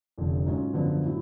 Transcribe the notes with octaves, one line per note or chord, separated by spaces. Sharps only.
F1 F2 D3
G#2 F#3 C#4 F4
F#2 D3 F3 B3 D4
A2 F#3